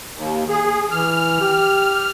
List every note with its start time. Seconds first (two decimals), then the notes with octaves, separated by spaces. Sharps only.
0.15 D#2
0.49 G#4
0.91 E3 F6
1.41 G4